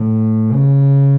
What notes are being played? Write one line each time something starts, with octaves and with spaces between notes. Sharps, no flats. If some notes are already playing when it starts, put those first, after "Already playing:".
Already playing: A2
C#3